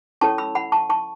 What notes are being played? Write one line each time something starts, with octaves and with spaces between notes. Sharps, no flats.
C#4 E4 A4 C#5 A5 C#6
B5 E6
F#5 B5
A5 C#6
A5 C#6